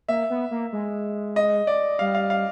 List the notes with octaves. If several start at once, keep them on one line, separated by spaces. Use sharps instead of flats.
A#3 E5
B3
A#3
G#3
D#5
D5
G3 F5
F5
F5